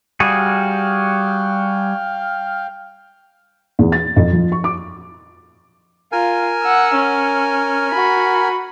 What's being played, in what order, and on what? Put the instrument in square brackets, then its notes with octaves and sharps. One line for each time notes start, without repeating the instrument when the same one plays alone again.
[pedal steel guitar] G3 F#4 G#4 [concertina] F5 G5 F6
[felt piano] E2
A6
F2
F3
C#6
D6
[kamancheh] F4 [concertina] A#4 G#5
[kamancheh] F#5 E6
C#4
F#4 B5